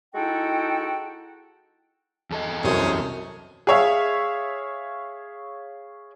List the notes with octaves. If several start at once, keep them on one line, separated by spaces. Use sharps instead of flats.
G#3 D#4 E4 F#4 A4 G5
E2 A4 D#5
C2 F#2 C5 C#5 D#6
G#4 C#5 E5 F5